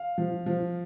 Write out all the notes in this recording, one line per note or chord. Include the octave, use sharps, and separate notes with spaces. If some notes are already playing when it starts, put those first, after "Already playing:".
Already playing: F5
F3
F3